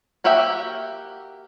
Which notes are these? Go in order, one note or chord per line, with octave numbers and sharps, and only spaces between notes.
A#3 F#4 G4 E5 G5